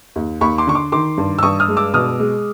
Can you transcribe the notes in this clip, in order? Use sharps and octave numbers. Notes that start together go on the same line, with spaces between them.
D#2
D#2 B5 C#6
C6 D6
D3 C#6
C6 D6
D#3 C6 D6
G2
E6
G2 C#6 D#6
D#6 F6
G#3
D6 E6
B2 D#6 F6
G#3